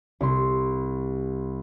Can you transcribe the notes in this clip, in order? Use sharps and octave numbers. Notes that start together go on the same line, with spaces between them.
C2 C6